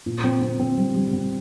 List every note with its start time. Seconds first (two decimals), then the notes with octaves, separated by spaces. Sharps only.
0.06 A#2
0.24 C4
0.42 C4
0.59 C4
0.77 G3
0.95 G3
1.13 C4